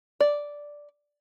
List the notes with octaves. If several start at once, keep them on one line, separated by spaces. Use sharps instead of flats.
D5